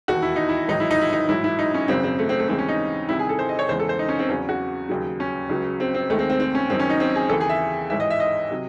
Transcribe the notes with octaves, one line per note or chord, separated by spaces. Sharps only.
E1 D#2 D#3 F#4
E4
D#4
E4
A1 G#2 D#3 F#3 D#4
E4
D#4
E4
D#4
A1 G#2 F#3 E4
E4
D#4
C#4
G#1 F#2 C#3 C4
C4
A3
C4
A3
D#2 C#3 E3 G#3 C4
C#4
D#4
C2 C3 D#3 E4
G#4
A4
C5
D#5
C#5
E2 C#3 E3 G#3 C5
A4
C5
D#4
C#4
C4
E2 C#3 F#3 C#4
F#4
D#2 C#3 F#3
C#4
C#2 C#3 F#3
C4
C4
D#2 D#3 G#3 A3
C4
C4
C4
C#4
F#1 F#2 D#3 C4
C#4
D#4
C4
G#4
D#2 C#3 E3 A4
G#4
E5
A1 G#2 E3 E5
D#5
E5
D#5
C3 F#3